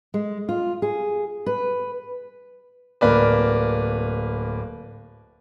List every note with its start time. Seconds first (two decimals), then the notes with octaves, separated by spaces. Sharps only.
0.14 G#3
0.49 F4
0.82 G#4
1.46 B4
3.01 D1 A#3 B4 D5